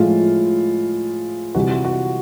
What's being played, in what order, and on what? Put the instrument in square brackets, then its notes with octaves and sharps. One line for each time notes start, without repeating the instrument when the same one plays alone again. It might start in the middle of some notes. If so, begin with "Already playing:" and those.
Already playing: [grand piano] A2 F3 G#3 F4
C3 E3 G3 F#4
F#4